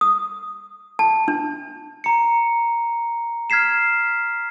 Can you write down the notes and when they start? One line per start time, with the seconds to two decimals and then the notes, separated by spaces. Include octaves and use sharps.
0.01 D#6
0.99 A5
1.28 D4
2.04 A#5 C#7
3.50 F6 G#6 B6 C7 E7